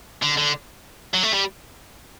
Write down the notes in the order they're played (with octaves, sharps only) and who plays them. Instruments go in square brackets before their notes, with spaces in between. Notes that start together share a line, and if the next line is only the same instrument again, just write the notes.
[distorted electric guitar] D3
D3
F#3
A3
G3